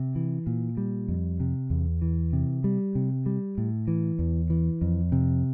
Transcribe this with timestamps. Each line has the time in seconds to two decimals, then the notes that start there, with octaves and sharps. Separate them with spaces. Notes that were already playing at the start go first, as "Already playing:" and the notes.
Already playing: C3
0.15 E3
0.47 A#2
0.77 G3
1.08 F2
1.40 C3
1.70 E2
2.02 E3
2.33 C3
2.64 G3
2.95 C3
3.26 G3
3.58 A2
3.88 E3
4.19 E2
4.50 E3
4.81 F2
5.12 C3